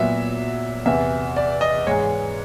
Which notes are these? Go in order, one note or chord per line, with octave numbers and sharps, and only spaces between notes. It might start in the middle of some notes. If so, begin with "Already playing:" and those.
Already playing: A#2 F#3 B3 E5
E2 C3 E3 E5
D5
D#5
G#2 E3 G#3 C#5